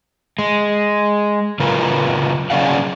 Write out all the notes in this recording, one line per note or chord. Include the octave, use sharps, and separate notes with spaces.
G#3
C#3 F#3 F4 A#4 B4
F#3 C#4 G#4 D5 F5 F#5